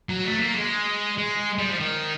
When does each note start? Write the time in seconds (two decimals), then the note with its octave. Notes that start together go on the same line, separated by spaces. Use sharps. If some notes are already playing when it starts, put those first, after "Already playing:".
0.09 F#3
0.25 A3
0.40 A#3
0.56 G#3
1.18 G#3
1.58 G3
1.69 F3
1.79 D#3